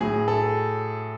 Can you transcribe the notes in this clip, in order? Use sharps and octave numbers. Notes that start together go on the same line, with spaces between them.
A2 F#3 G#4
A4